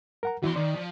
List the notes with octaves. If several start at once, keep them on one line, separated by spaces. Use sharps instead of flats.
A#4 F#5 A#5
E2 E3 E4 F#4 C6
D#3 D5
F3